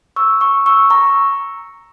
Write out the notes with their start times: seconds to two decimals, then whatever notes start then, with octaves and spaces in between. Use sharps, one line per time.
0.16 C#6 E6
0.41 C#6 E6
0.66 C#6 E6
0.90 A#5 C#6